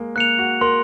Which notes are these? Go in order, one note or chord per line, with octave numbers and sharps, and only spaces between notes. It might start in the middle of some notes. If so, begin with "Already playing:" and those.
Already playing: G#3 A#3
A#3 F#6 C#7 F7
F#4
A#4 C6